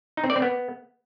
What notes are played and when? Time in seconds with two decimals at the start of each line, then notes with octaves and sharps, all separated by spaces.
0.17 D#4
0.24 C4
0.30 D5
0.36 C4
0.42 B3